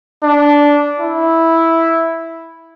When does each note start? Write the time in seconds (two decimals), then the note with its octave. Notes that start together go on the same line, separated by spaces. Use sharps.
0.24 D4
1.00 E4